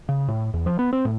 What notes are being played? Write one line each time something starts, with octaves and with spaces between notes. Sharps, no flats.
C#3
A2
E2
F3
B3
C4
A2